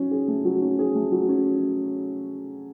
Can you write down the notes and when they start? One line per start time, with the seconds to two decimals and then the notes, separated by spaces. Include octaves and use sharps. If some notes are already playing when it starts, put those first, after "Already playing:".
Already playing: F#3 C#4
0.11 G#4
0.28 A3
0.45 F#3
0.62 C#4
0.79 G#4
0.95 A3
1.12 F#3
1.29 C#4